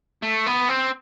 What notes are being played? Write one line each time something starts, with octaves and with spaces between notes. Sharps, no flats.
A3
B3
C4